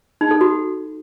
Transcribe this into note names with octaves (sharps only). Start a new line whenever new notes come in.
D#4
A4
F#4